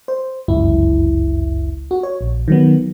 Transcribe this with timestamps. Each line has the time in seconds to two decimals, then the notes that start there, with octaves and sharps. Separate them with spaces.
0.08 C5
0.48 G1 C#2 F#2 E4
1.91 F#4
2.03 C#5
2.21 A#1
2.48 D#3 F#3 B3